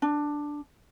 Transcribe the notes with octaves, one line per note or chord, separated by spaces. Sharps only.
D4